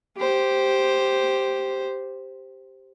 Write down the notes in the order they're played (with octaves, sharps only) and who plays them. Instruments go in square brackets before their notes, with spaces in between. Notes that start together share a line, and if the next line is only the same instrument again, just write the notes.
[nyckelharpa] G4 C5